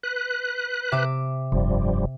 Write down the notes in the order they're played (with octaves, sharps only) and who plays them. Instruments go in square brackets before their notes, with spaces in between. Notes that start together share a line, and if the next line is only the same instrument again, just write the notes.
[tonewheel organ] B4 F#6
[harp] C3 E5 D6
[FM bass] F1 [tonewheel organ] G2 F3 G3